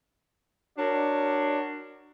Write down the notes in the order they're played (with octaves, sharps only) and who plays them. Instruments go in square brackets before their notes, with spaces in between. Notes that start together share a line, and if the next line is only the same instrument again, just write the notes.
[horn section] D4 F#4 A#4 C#5 D5